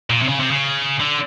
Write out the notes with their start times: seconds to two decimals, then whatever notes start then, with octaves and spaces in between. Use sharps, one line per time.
0.10 A#2
0.22 C3
0.28 C#3
0.40 C3
0.51 C#3
1.00 D3